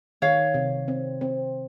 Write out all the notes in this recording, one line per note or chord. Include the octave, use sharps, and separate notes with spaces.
D#3 C#5 F5
C3
C4
C4